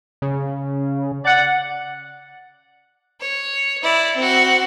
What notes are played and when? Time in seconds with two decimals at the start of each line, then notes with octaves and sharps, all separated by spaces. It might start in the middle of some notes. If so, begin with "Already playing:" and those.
0.22 C#3
1.25 D5 F#5
3.20 C#5
3.83 E4 D5
4.16 C4 F#4